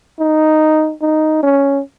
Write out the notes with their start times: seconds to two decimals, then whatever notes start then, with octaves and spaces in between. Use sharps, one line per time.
0.19 D#4
1.02 D#4
1.43 C#4